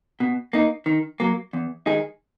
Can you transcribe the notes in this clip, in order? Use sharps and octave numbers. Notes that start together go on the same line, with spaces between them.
B2
A#3 D#4
D#3
F#3 A#3
E2
D#3 G#3 D#4 G#4